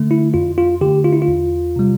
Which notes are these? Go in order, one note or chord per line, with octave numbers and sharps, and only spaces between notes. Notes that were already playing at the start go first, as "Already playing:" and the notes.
Already playing: D3 A3
E4
F2 F4
F4
D3 A3 G4
F4
E4
F4
E2
C3 G3